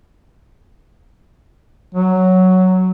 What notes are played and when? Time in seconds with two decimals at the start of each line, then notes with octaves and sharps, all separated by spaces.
1.94 F#3